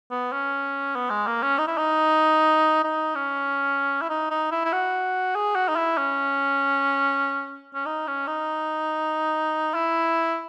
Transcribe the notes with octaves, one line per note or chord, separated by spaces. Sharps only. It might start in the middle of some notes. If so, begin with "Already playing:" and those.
B3
C#4
B3
G#3
A#3
C#4
D#4
E4
D#4
D#4
C#4
E4
D#4
D#4
E4
E4
F#4
G#4
F#4
D#4
E4
C#4
C#4
D#4
C#4
D#4
E4